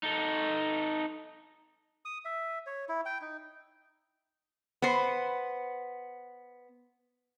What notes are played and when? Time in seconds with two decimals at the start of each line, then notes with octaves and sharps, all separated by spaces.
0.03 D#4 A4
2.05 D#6
2.25 E5
2.66 C#5
2.89 E4
3.06 G5
3.21 D#4
4.82 B3 C5